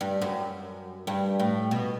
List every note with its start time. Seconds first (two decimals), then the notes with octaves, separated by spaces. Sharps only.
0.01 G2
0.22 F#2
1.07 G2
1.40 A2
1.71 B2